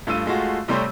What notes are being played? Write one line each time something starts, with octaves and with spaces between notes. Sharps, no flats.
G2 A3 F4 E6 D#7
G#3 A3 F4 F#4
C3 G3 A3 C4 C#5 C6